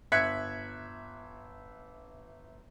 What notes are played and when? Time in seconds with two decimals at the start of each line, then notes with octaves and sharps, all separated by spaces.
0.12 G1 E5 F#6 G#6 B6 C#7